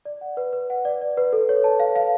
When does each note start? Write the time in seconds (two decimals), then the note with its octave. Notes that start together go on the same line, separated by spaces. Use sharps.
0.05 D5
0.21 F#5
0.37 B4
0.53 B4
0.70 F#5
0.85 D5
1.01 D5
1.17 B4
1.33 A4
1.49 C#5
1.64 A5
1.80 F5
1.95 F5